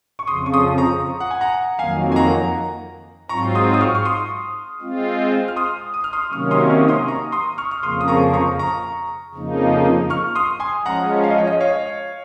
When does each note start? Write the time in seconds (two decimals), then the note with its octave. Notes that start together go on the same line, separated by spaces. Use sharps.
0.19 C#6
0.27 F2 C#3 F3 C6 D#6
0.46 C#6
0.54 C6 D#6
0.78 A#5 C#6
1.20 F#5
1.31 G#5
1.41 F#5 A#5
1.79 F2 D#3 F#3 A#3 F5 G#5
2.12 G#5
2.16 F#5 A#5
3.29 G#2 F#3 C4 F4 A#5 C#6
3.55 C6 D#6
3.74 D#6
3.81 C#6 F6
3.95 C#6
4.05 C6 D#6
4.81 G#3 C4 F4
5.48 F6
5.56 C6 D#6
5.94 D#6
6.04 F6
6.13 C6 D#6
6.32 C3 D#3 F#3 A#3 C#4 C#6 F6
6.51 C6 D#6
6.69 C#6 F6
6.88 C6 D#6
7.08 A#5 C#6
7.32 C6 D#6
7.58 C#6 F6
7.71 F6
7.83 F2 C#3 F3 A#3 C6 D#6
8.01 D#6
8.08 A#5 C#6
8.33 A#5 C#6
8.59 A#5 C#6
9.35 F2 C#3 F3 A#3 D#4
10.10 C#6 F6
10.35 C6 D#6
10.60 G#5 C6
10.85 F3 G#3 C#4 F#5 A#5
11.24 F5
11.30 D#5
11.38 C#5
11.47 D#5
11.60 C#5 F5